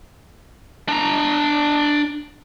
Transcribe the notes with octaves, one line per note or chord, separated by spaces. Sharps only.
D4 A#5